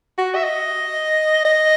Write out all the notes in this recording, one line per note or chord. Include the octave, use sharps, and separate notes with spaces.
F#4
E5
D#5
D#5